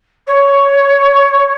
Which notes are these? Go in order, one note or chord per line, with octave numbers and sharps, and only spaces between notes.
C#5